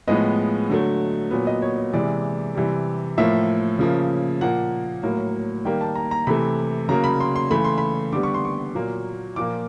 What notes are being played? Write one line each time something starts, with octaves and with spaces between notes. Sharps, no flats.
A2 F3 G#3 B3 D#5
D3 F#3 A3
A#2 F#3 B3
D#5
C#5
C#5
C3 E3 G#3 D5
C3 E3 G3
A2 F3 A#3 E5
C#3 F3 A#3
A#2 F3 A#3 F#5
A2 F#3 A#3
D#3 G3 A#3 G5
A5
A#5
A#5
C3 E3 A3 B5
C#3 F#3 A#3 A#5
B5
C6
C6
C#3 E3 A3 B5
C6
B5
D3 G3 B3 D6
C#6
C6
C#6
A#2 F#3 A#3
A#2 F3 A#3 D6